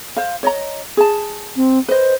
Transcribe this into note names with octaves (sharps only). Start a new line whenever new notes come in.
C5 F5
C#5 D#5 A#5
G#4 A5
C4
B4 C5 D#5